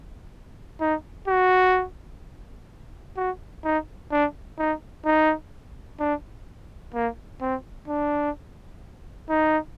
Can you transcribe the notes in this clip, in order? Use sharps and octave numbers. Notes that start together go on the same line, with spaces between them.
D#4
F#4
F#4
D#4
D4
D#4
D#4
D4
A#3
C4
D4
D#4